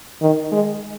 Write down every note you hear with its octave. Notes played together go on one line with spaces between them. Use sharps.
D#3
G#3